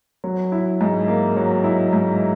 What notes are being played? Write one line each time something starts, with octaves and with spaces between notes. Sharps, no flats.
F#3
E4
G#2
A#3
F#3
E4
G#2